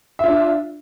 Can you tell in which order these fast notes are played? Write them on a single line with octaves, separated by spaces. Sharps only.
E5 F4 D4